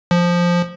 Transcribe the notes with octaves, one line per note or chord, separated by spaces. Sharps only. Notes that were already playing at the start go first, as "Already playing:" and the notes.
F3